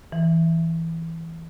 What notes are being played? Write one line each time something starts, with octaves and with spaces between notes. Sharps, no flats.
E3